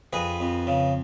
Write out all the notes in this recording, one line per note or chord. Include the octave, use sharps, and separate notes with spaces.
F2 G#4 B4
F2
C#3